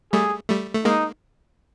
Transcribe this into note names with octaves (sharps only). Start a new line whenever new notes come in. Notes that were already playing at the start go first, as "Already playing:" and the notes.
G3 A3 G#4
G3 A3
A3
G#3 A#3 D#4